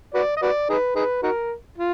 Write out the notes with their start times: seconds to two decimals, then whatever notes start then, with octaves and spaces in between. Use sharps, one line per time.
0.14 F#4 B4 D5
0.37 D#5
0.42 F#4 B4 D5
0.70 D#4 G#4 B4
0.96 D#4 G#4 B4
1.23 D#4 F#4 A#4
1.78 F4